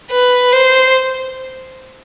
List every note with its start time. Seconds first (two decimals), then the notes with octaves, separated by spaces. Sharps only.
0.11 B4
0.53 C5